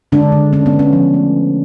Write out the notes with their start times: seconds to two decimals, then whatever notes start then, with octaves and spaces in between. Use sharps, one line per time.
0.12 D3 G#3 D4
0.32 D3
0.53 D3 C#4
0.66 B3
0.73 D3
0.79 C#4
0.93 F3
1.14 A3